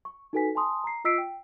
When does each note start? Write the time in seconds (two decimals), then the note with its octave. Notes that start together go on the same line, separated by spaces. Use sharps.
0.05 C#6
0.33 D#4 F#4 A4 B4 G#5 B6
0.55 G#5 A5 C6 D#6
0.84 A#5 C7
1.05 F4 D#5 E6 B6 C7 D7
1.18 G5